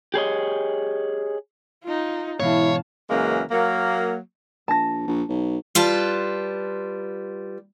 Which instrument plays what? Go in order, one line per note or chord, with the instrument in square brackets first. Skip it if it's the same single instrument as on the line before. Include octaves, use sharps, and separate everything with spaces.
[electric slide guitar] G4 G#4 C#5 D#5
[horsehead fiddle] D#4 F4
[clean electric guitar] G#2 B2 E3 [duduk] E4 [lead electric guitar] C#5 [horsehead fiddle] F5 A5
[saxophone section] F#2 C#3 E3 G#3 A#3
F#3 A#3
[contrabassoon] A#1 [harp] A5 A#6
[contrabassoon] A#1
B1
[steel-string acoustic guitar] G3 F4 B4 A5